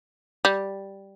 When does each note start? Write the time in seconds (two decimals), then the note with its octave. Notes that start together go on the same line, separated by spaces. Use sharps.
0.45 G3